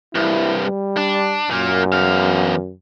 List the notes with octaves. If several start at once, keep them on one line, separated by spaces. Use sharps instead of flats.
C2 G2 E4
G3
D4
F#2 A#2 A#3
E2 F5